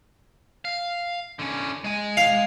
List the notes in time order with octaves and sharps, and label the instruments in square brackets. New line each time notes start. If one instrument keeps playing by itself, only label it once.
[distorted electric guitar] F5
D3 C#4
G#3 G#5
[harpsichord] F5